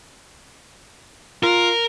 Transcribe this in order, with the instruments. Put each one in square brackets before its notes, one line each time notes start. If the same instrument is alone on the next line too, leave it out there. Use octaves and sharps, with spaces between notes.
[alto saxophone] F4 [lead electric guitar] A#4